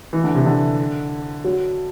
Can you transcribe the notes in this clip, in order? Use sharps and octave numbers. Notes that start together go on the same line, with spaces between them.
E3
D3
C3
D3
F#3